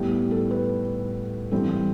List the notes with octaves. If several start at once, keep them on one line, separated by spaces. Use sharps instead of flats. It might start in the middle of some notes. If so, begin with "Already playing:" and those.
Already playing: A2 G3 B3 G4
A4
B4
G2 E3 G3 C4 A4